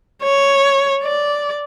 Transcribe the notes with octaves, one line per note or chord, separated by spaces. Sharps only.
C#5
D5